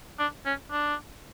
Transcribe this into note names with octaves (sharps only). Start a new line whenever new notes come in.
D4
C#4
D4